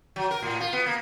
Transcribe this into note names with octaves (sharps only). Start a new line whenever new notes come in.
F#3
A#4
A2
F4
B3
A#3